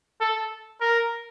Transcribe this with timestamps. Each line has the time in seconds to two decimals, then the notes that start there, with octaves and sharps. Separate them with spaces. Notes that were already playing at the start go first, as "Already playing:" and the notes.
0.20 A4
0.81 A#4